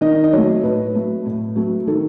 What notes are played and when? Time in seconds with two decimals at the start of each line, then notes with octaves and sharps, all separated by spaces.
0.01 D#3 D#5
0.24 D#5
0.33 F#3 A3 C#5
0.63 A2 B4
0.95 F#3 A3
1.26 A2
1.56 F#3 A3
1.87 D#3 A4